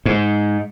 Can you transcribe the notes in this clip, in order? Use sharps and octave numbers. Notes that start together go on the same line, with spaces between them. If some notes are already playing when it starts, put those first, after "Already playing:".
G#2